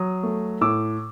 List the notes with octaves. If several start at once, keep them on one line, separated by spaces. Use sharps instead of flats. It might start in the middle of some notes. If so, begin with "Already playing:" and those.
Already playing: F#3 D#6
A3
A2 D6 E6